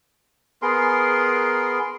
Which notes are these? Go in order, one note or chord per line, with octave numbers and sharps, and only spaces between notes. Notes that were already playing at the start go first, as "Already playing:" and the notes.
B3 G#4 A#4 C6